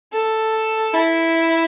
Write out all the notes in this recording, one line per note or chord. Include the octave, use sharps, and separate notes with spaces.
A4
E4